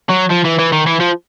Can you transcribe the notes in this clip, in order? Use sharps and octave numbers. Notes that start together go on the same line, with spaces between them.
F#3
F3
E3
E3
D#3
E3
F3